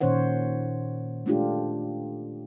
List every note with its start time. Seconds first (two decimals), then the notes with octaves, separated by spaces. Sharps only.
0.01 A#2 D#3 C#4 C5 C#5 F#5
1.26 G#3 A3 D4 F4 G4